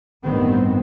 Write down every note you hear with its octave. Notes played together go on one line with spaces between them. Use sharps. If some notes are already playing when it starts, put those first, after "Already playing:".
A1 G2 D#3 B3 C4